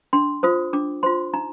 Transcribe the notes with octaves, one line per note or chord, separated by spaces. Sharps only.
D4 C6
F4 C5 D#6
D4 D6
F4 C5 C6
D#4 A#5